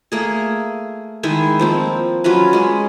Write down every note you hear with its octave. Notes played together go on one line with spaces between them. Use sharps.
A3 A#3 G#4
D#3 G#3 E4 E5
F3 A#3 C4
F#3 C#4 F4 B4
G#3 C#4